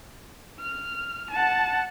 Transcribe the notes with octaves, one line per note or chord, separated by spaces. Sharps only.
F6
F#5 A5